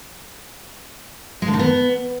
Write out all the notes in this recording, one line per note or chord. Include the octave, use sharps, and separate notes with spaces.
G#3
D3
D#3
B3